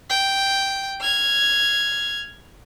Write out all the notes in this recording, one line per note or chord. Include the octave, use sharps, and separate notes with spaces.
G5
F6 G#6